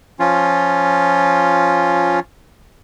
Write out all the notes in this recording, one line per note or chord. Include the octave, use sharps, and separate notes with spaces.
F3 C#4 F4